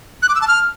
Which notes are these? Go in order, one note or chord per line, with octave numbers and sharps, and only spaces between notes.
F#6
D6
E6
A5
F6